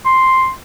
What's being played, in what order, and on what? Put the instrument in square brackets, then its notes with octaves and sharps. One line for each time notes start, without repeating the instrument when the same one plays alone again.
[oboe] C6